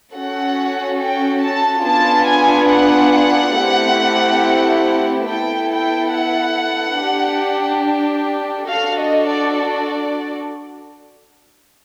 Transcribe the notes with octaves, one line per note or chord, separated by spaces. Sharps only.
C#4 F#4 A4 F#5
G5
A5
B3 D4 F4 G#4 A5
G#5
F#5
A3 C4 E4 G4
B3 E4 A4 G5
G5
F#5
D4 G4
D4 F#4 A4 F5
D#5
D5
D5